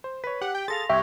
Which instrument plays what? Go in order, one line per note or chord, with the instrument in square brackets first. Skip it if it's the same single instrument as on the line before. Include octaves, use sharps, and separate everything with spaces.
[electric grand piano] C5
[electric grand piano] B4 C#5 [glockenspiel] B6
[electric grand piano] G4 [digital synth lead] F#5
[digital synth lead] G5
[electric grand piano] G#4 A4 F5 [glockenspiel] C6 A#6 F7 [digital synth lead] A6
[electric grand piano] C2 [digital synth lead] G4 [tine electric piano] E5 [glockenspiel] C#6 F#6 G#6